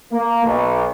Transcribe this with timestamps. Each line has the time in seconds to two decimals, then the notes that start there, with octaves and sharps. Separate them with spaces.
0.12 A#3
0.44 B1